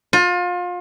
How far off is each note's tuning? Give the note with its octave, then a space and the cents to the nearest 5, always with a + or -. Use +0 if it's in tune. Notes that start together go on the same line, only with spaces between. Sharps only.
F4 +30